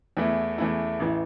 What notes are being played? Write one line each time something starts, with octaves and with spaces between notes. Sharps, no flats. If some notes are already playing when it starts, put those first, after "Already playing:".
E2 E3 A3 E4
E2 E3 A3 E4
A1 E3